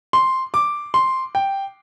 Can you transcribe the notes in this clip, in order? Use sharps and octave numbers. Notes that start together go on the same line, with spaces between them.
C6
D6
C6
G5